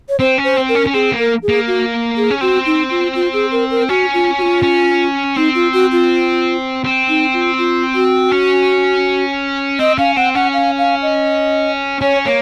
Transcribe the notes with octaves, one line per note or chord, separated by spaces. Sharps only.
C#5
C4 C5
C#4
C5
C4
A#4
C#4
C#4
C4 G#4
A#3
A#4
G#4
A#3
F#4
G#4
C#4
C4 F#4
D#4
F4
F4
G#4
A#4
A#4
C#4 F#4
F4
F#4
F4
C#4
C4 D#4
F4
F#4
F4
C4
D#4
F4
F4
F#4
C#4
C4 D#5
C#4 F5
C4 F#5
C#4 F#5
F5
F5
D#5
C#4 C#5
A#3 C#5